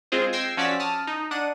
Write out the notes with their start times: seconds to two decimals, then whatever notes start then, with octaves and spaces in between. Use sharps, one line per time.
0.12 G#3 C4 F4 G#4 C5
0.33 G5 E6 G#6 A#6 C7
0.57 F3 C#4 F#4 D5 E6 B6
0.80 A5 D#6 F6
1.07 D#4
1.31 D4 F#5 D#7